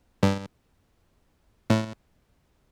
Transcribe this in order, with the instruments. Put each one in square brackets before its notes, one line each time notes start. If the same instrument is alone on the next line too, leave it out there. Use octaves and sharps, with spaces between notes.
[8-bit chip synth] G2
A2